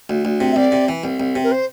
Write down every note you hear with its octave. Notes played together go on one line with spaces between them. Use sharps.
D2
D2
C3
E5
C2 D5
C3
E3
C2
C2
C3
A#4
C5